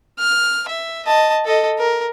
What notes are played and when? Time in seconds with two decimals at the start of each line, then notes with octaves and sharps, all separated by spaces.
0.19 F6
0.68 E5
1.06 D#5 A5
1.45 A4 D#5
1.78 A#4